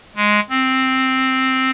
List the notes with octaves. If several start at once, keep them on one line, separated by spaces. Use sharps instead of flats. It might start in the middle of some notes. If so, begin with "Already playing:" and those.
G#3
C4